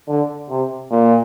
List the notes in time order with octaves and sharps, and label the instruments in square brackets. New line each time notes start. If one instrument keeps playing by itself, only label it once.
[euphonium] D3
C3
A#2